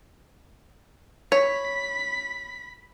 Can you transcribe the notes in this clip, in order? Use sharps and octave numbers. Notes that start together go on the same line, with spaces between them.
C#5 B5 B6